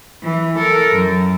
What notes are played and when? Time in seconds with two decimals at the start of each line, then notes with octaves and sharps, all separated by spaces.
0.23 E3
0.58 A4 A#4
0.94 F#2